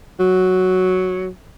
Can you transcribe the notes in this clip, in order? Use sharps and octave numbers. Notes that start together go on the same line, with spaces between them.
F#3